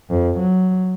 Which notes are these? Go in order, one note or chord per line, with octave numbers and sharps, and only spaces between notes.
F2
F#3